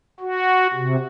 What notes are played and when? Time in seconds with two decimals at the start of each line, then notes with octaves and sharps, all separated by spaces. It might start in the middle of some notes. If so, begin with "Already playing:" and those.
0.20 F#4
0.74 C3